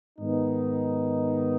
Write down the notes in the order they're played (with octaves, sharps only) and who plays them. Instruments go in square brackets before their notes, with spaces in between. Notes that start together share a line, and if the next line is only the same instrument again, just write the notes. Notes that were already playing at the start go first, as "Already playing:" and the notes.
[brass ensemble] G#2 D#3 B3 D#4